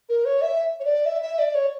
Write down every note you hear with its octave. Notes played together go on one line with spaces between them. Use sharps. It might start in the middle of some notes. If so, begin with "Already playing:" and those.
A#4
C#5
E5
C#5
D5
E5
E5
D5
C#5